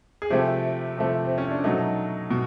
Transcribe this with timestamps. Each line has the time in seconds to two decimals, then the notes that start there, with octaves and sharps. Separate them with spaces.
0.22 G#4
0.30 C3 F3 A3 G4
0.97 C3 F3 A3
1.25 C4
1.38 C#4
1.51 D4
1.64 B2 F#3 A3 D#4
2.31 B2